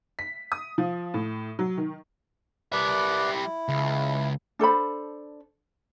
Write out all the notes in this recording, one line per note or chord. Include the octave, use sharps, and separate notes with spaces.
B6
D#6
F3
A2
F#3
D#3
G3 B4 D5 E5
E4
C#2
D4 A4 C5 B5